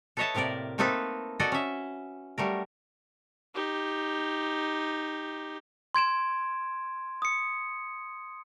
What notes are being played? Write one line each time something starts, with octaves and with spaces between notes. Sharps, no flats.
A4 B4 C#5 D#5 E5 A5
A2 C3 A#3 A#4 D5
A3 A#3 C4 D#4 A4 B4
F#4 A4 D5 D#5 G#5
C#4 E5
F#3 G3 A3 A#4
D#4 G4
C6 G#6 D7 E7
D#6 C#7